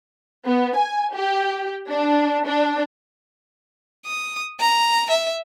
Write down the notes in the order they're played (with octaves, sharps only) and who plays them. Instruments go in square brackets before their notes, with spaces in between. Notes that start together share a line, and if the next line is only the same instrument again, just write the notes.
[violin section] B3
G#5
G4
D4
D4
[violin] D#6
A#5
E5